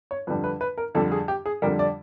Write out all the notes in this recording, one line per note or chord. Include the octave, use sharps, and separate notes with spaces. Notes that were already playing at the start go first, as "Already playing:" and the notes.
C#5
F2 D3 G3 B4
B4
B4
A#4
F2 D3 G3 A4
G#4
G4
G#4
F2 D3 G3 A#4
D5